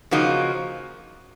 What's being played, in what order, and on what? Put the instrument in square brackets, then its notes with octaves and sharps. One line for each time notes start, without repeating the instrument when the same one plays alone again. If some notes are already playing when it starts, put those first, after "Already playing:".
[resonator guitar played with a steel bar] C#3 F3 A#3 D#4 F#4